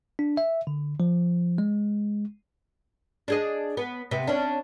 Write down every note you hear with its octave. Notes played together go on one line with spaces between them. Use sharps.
D4
E5
D3
F3
G#3
D4 G#4 D#5
B3
C3 B3
C#4 D4